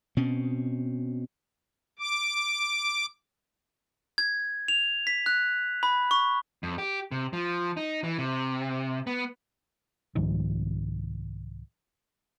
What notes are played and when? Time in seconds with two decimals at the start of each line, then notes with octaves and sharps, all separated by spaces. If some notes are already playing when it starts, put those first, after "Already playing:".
0.17 B2 C4 C#4
1.99 D6
4.18 G#6
4.68 F7
5.07 B6
5.26 F#6
5.83 B5
6.11 C#6
6.63 F2
6.78 G4
7.12 C3
7.33 F3
7.77 D#4
8.04 E3
8.18 C3
9.07 B3
10.15 C2 G#2 D#3 F3